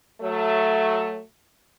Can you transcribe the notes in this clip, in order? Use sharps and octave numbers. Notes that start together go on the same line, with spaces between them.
F#3 A3